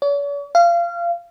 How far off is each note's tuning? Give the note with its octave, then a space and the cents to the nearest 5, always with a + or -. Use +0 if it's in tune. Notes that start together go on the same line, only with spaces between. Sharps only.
C#5 +45
F5 -25